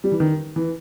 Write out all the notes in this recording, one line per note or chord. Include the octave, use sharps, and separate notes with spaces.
G3
E3
D#3
E3